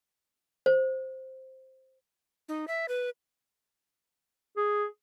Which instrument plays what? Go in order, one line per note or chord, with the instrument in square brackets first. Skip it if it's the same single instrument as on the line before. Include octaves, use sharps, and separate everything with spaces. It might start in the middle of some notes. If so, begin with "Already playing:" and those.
[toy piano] C5
[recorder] D#4
E5
B4
[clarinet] G#4